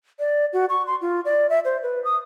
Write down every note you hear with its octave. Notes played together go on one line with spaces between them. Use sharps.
D5
F#4
C#6
C6
F4
D5
E5
C5
B4
D#6